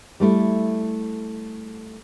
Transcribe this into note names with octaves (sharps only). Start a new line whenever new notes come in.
G3 A3 E4